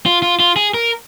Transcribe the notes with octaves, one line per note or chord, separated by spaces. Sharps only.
F4
F4
F4
G#4
A#4